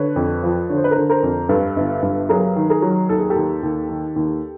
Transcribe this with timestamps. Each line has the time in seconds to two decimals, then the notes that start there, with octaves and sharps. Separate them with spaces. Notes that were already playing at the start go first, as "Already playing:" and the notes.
Already playing: D3 B4 C#5
0.16 F2
0.43 F3
0.69 D3 C#5
0.76 C5
0.84 B4
0.91 D3 A#4 C5
1.09 A#4 C5
1.23 F2
1.49 G2 A4 B4
1.76 G1
2.03 G2
2.29 F#3 G#4 A#4
2.56 D#3
2.70 G#4 A#4
2.82 F#3
3.09 D#2 A4
3.20 G#4
3.30 G4 A4
3.36 D#2
3.63 D#2
3.89 D#3
4.16 D#2